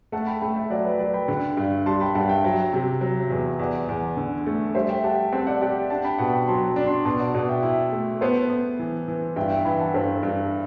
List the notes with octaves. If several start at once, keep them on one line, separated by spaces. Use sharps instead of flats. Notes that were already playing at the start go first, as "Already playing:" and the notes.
A3 F#5 A5
G5 B5
A3 G5 B5
E5 G5
F#3 D5 F#5
B4 D5
F#3 B4 D5
G5 B5
D3
G2
G3 A5 C6
G5 B5
G2 F#5 A5
E5 G5
F#3
C3
F#3
E2
E2 D5 F#5
E2
D3
A3
G3 C5 E5
E5 G5
G4 F#5 A5
C4 F#5 A5
D5 F#5
G4 D5 F#5
D4 F#5 A5
G5 B5
B2 F#5 A5
G5 B5
F#3 A5 C6
D4
A5 C6
B2 A5 C6
D5 F#5
B2 D5 F#5
E5 G5
E4
A3
B3 A4 C5
B3
E3
E3
G2 E5 G5
E5 G5
E3 G5 B5
F#5 A5
G2 A4 C5
G2